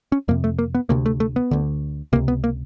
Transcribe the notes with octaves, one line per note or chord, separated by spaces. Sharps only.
C#4
F2 C3 A#3
A3
A#3
B3
D2 C3 A#3
A3
A3
B3
D2 D3
C#2 C3 A#3
B3
A#3